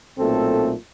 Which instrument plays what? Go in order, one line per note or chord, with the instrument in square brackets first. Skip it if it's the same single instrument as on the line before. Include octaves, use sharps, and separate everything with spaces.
[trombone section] B1 A#2 A3 C4 A4